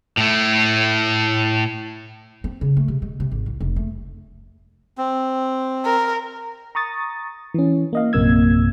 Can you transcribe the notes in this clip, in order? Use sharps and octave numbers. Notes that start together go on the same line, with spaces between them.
A2 A3
C4
C#3
A3
C3
G#3
C3
G#1
C2
F1
A3
C4
A#4
A#5 C#6 D#6 A6
E3 C#4
A#3 D#5 F5
A#1 F#2 C3 A#3 E6 G#6